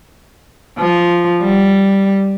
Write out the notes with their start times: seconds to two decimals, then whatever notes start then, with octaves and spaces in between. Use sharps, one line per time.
0.79 F3
1.42 G3